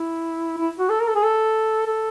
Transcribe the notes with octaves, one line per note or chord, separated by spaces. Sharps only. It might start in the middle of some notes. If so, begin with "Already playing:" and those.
Already playing: E4
E4
F#4
A4
A#4
A4
G#4
A4
A4